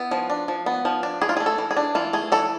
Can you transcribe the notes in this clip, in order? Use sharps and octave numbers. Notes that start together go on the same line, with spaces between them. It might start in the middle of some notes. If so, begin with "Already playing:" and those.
Already playing: B3 E4
F3
D4
F3
B3
F3
D4
E3 G#4
F4
G#4
A3
A4
E3
G#4
D4
E3 F4
A3 G#4
E3 A4